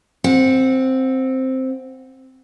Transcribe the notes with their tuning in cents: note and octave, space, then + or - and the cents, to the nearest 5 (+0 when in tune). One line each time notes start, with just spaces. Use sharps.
C4 +0 F#5 -25